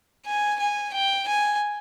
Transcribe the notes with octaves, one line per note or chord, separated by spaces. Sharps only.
G#5
G#5
G5
G#5